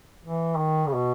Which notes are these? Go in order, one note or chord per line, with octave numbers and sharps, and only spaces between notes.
E3
D#3
C#3
B2